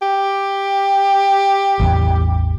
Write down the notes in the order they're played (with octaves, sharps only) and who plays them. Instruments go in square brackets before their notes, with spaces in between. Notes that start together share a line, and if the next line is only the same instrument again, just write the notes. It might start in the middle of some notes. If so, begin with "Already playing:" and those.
[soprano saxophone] G4
[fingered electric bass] A1 E2